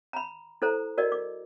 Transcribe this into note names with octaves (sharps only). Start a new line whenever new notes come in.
A#5 B5
E4 A4 C5 A#5
F#4 A#4 D5 D#5
D6